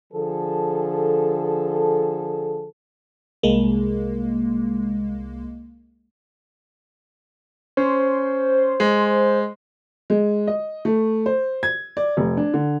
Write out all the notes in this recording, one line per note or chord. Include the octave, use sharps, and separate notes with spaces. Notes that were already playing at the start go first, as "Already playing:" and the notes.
D3 F3 G#4 A4
C2 G#3 A#3
C#4 C5
G#3
G#3
D#5
A3
C5
G#6
D5
F1
D4
D3